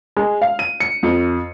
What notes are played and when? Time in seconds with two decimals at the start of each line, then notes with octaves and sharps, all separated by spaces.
0.17 G#3
0.42 F5
0.59 D#7
0.80 C#7
1.03 F2